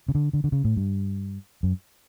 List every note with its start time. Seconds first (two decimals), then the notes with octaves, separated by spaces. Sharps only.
0.09 C#3
0.15 D3
0.33 D3
0.44 D3
0.52 C#3
0.64 A2
0.77 G2
1.63 F#2